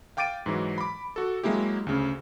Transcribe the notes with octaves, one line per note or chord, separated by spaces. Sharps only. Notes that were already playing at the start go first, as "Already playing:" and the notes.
F5 G5 D6 A6 D7 D#7
G#2 E3 F#3
B5 D6
F#4 A4
F#3 G#3 A#3 E4 G4
D2 C#3